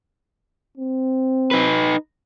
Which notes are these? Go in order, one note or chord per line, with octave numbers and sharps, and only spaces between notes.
C4
D#4 B4